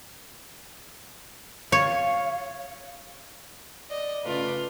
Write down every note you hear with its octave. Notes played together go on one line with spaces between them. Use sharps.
C#5 F5
D5 D#5
C#3 A3 F4 B4 D5